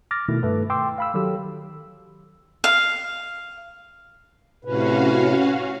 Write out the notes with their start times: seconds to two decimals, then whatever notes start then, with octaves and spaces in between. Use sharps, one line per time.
0.11 D6 F6 A6 A#6
0.29 B2 D#3 A3 E4
0.43 G2 A3 A4 B4
0.70 G5 C6 D6 E6
0.98 F5 B5 E6
1.14 D#3 F#3 G4 A4 E6
2.64 F5
4.65 A2 C3 C#4 F#4 B4 F5